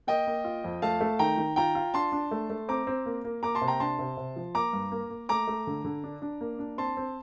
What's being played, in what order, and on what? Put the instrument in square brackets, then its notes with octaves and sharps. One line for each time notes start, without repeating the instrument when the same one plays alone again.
[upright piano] A#3 [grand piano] D#5 G5
[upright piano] A#3
F4
F2
[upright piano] A3 [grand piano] F5 A5
[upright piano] A3
[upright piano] D#3 [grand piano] G5 A#5
[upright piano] D#3
[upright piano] F4 [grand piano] G5 A#5
[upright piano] F4
[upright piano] D4 [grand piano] A5 C6
[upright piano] D4
A3
A3
[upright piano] C4 [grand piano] A#5 D6
[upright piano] C4
A#3
A#3
[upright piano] A#3 [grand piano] A#5 D6
[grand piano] A5 C6
[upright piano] C3
[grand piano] G5 A#5
[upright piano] D4 [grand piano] A5 C6
[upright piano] C3
C3
F3
[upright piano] A#3 [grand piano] A#5 D6
[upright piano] G2
A#3
A#3
[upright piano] A3 [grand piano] A#5 D6
[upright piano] A3
D3
D3
D4
D4
A#3
D4
[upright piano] C4 [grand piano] A5 C6
[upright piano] C4